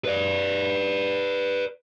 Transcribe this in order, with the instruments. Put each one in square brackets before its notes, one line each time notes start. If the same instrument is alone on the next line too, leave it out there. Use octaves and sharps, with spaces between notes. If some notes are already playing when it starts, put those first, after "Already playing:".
[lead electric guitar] B4 D5